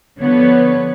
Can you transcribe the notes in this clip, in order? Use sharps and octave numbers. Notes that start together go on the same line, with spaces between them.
D3 F3 B3 B4 C#5